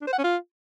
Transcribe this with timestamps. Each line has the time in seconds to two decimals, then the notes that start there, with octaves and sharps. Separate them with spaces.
0.01 D4
0.07 C5
0.13 F#5
0.18 C#4
0.24 F4